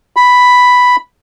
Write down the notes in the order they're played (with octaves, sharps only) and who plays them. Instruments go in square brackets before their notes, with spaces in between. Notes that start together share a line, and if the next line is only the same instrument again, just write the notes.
[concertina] B5